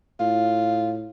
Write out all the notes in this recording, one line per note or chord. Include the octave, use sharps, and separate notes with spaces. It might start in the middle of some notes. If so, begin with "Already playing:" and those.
A2 F4